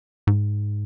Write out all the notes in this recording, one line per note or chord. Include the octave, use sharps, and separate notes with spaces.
G#2